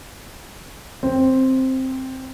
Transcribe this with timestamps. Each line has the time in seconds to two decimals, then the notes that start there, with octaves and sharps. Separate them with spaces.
1.03 C4